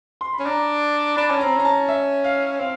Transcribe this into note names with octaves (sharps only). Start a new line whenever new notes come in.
C6
B5
C#4
D4 A#5
D4 B5
C#4 A5
A#5
C4
C#4 A#5
A5
E5
F5
C4 F5